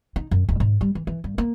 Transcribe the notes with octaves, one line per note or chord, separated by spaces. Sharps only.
D#4
F#2
D1
G#2
G3
E3
E3
G2
A#3